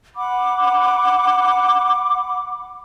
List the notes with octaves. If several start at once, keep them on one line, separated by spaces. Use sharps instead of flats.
F#5 B5 D6